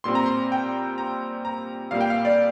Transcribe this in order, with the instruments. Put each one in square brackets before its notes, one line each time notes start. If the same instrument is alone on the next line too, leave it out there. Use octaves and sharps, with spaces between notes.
[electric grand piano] A#2 G3 C4 C6
A#5
C6
G5
A#5
A#5
A#2 G3 A#3 F5
G5
F5
D5